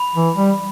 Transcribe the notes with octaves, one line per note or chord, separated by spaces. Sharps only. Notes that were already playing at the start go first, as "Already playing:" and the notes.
Already playing: B5
E3
G3